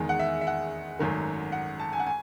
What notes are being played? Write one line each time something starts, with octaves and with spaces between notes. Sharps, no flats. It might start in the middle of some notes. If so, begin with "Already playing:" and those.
Already playing: E2 D#3 G#3
F#5
E5
E5
F#5
G#1 F#2 D#3 A3
F#5
A5
G#5
F#5
G#5